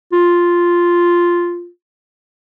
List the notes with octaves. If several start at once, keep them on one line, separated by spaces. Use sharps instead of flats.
F4